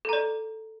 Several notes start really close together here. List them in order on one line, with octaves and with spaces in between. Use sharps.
A4 A#5 D5